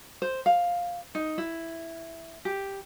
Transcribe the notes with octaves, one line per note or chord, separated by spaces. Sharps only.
C5
F5
D#4
E4
G4